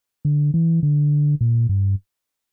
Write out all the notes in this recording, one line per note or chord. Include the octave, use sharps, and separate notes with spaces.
D3
E3
D3
A#2
G2